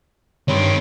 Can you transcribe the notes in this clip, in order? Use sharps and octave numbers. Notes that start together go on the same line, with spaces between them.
G2 D#3 C4 C#5 B5 D7